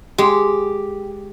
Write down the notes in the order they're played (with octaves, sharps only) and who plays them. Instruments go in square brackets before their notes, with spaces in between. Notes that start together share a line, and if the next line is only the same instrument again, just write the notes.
[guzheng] G#3 [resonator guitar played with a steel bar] G4